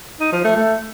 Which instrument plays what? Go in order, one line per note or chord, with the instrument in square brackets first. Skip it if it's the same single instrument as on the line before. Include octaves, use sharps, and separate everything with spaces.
[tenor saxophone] D#4
F3
A3
A3